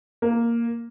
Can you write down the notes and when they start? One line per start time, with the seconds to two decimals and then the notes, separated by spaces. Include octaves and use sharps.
0.22 A#3